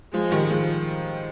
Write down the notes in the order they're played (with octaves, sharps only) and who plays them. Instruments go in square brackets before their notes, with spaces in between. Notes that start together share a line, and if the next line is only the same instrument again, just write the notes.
[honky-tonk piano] F3 [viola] G#3
[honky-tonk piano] D#3 G3
F3 G#3